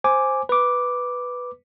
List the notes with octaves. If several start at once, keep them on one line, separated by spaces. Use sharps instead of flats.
C5 G#5 D6
B4 D6